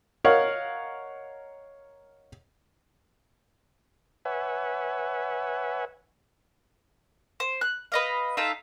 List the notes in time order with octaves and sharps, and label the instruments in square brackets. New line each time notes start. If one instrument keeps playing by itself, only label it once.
[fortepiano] A#4 C#5 D#5 F5 F#5
[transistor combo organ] B4 C#5 E5 F#5 G#5
[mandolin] C5
F#6
B4 D#5 F5
D#4 F4 A4 E5